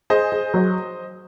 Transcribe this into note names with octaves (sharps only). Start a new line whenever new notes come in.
G#4 C5 D#5
G#4
F#3